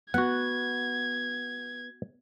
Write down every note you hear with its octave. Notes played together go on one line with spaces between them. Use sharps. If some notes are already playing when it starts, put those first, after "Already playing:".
B3 F#4 F#5 G#6